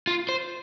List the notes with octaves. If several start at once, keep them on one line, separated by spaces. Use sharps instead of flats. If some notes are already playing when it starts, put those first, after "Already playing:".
F4
C5